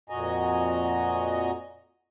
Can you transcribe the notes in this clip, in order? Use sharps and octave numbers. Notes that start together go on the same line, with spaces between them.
F2 A#2 F#4 D#5 G#5 A#5